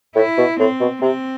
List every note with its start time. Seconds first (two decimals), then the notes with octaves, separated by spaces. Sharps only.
0.15 A2 E4
0.38 B2
0.59 A2 C4
0.80 B2
1.01 C3 C4